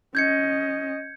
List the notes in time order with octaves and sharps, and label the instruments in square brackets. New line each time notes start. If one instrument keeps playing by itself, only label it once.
[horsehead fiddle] C#4 D#5 [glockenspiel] G6 G#6 C#7